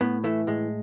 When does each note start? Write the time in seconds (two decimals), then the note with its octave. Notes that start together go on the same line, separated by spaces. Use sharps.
0.01 A2 B3
0.24 E3 A3
0.47 A2 G#3